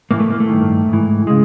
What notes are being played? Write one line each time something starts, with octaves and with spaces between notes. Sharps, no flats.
A2 E3 A#3
A3
A#3
A3
G2 D#3
G#2 E3
C#3 G#3